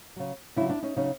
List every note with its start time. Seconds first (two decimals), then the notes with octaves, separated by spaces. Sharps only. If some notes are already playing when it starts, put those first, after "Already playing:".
0.16 C#3 F#3
0.56 C#3 D4 E4
0.61 F#3
0.69 D4 E4
0.83 C#4 D#4
0.96 C#3 F#3 C#4 D#4